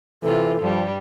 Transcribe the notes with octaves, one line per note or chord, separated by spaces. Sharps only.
C3 E3 F4 A4
G2 F3 G3